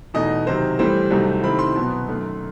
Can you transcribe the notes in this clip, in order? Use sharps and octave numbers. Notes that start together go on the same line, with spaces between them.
E2 B2 A3 D#4 D#5
C3 D#3 F#3 C5
A2 E3 G3 C5
C2 C3 F#3 A3 D#4
C3 D#3 A3 C4 E4 B5
C6
B2 F#3 B3
F#2 D#3 A3